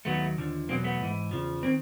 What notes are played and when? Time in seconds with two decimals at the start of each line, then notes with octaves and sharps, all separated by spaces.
0.05 D#2 D#3 F#3 A3 B3
0.37 D#2 D3 F3
0.68 E2 B2 F#3 A#3 C4
0.84 A3 B3
1.00 G#2 E3
1.31 E2 C#3 F3
1.63 D#3 A#3 C4